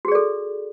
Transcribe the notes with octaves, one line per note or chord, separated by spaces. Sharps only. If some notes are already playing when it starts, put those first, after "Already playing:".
F#4 G#4 A4 D5